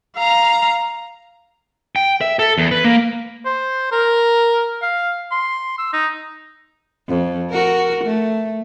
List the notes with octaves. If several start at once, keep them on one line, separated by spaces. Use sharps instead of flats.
F5 A#5
G5
E5
A4
E2
B4
A#3
C5
A#4
F5
C6
E6
D#4
F2
F#4 A#4
A3